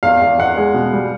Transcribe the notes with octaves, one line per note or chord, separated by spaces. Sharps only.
E2 F5
E2
E2 F#5
G#3
B2
G3